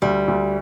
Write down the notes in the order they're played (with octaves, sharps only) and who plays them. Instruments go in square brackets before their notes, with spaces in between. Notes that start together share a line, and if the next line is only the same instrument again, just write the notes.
[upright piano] D2 [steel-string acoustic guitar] G3
[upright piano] D2